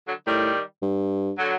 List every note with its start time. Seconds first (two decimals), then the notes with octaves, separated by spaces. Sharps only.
0.08 D3 F#3
0.26 A2 D#3 G3
0.82 G2
1.38 D3 F#3